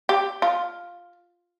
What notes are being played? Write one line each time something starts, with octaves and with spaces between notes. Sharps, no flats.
G4
F4